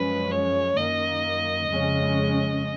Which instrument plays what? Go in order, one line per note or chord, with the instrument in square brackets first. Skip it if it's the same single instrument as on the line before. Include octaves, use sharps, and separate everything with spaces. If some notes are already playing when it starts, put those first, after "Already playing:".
Already playing: [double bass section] F#2 F3 G#3 C#4 [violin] B4
[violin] C#5
[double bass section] F#2 D#3 A#3 [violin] D#5
[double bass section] F2 C#3 G#3 C#4